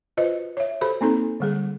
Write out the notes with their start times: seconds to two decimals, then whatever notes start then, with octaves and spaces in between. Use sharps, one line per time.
0.17 F4 F#4 B4 C5 D#5
0.57 C#5 E5
0.81 F#4 G4 A4 C5 B5
1.01 A#3 C4 D#4 A4
1.40 D3 G3 G#4